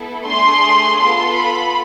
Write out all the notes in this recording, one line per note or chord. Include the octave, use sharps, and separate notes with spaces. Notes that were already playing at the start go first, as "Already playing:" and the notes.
Already playing: B3 E4 A4
A3 D4 G#4 C6
B3 F4 A4 C6
B5